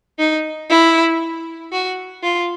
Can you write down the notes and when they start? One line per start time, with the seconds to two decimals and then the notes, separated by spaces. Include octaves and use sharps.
0.19 D#4
0.70 E4
1.72 F#4
2.23 F4